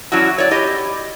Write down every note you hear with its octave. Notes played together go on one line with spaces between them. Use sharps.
F#3 C#4 D4 E4 F#4
C#5 D5
E4 G4 D#5